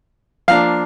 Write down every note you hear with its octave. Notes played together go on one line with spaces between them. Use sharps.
F3 A#3 D4 F5